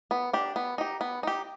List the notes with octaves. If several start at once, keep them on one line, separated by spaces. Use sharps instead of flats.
B3
D4 G4
B3
D#4 G4
B3
D#4 G4